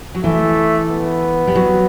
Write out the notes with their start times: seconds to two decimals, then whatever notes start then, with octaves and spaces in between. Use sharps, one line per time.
0.15 F#3
0.24 E3 A3
0.90 B3
1.47 G3
1.55 F#3